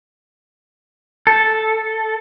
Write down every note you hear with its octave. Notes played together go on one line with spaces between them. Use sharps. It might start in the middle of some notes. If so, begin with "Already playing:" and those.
A4